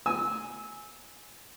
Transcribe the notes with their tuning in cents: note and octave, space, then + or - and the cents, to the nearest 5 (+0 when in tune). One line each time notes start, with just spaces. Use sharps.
G#5 +0 E6 -20